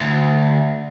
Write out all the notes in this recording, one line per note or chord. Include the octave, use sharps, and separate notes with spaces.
D2